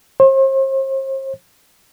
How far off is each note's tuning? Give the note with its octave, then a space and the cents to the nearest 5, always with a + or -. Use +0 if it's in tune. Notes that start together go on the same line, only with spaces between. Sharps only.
C5 +40